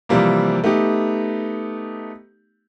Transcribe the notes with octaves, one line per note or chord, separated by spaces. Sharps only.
C3 E3 F3 G3 A#3
A3 B3 D#4 G4